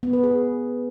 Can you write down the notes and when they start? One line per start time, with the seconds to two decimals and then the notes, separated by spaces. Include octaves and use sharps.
0.03 B3
0.13 B4
0.23 G#4